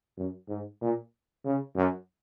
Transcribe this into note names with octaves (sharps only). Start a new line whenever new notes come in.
F#2
G#2
A#2
C#3
F#2